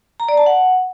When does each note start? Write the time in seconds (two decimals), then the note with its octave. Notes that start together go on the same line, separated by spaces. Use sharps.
0.20 A#5
0.29 D5
0.37 A5
0.46 F#5